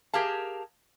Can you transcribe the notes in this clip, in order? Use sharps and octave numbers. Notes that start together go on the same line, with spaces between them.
G4 G#4 A#4 F5 A5